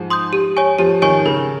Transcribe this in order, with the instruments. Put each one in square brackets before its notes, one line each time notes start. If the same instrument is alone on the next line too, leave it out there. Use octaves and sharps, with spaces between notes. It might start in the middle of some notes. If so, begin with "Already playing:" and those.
Already playing: [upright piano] G#2 F3
[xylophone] C6 D#6 G6
G4
C#5 G#5 C#6
[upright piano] F3 [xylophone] G4
[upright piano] D#3 [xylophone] C#5 G#5 C#6
[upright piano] C#3 [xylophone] A#4